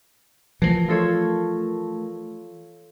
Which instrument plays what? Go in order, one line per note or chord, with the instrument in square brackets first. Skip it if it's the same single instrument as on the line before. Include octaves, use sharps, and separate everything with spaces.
[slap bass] E3 F3 [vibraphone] A3 A#4
[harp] F4 A4 C#5